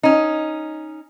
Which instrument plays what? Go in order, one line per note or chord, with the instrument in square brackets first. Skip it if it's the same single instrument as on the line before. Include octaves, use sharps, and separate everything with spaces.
[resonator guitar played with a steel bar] C#4 D#4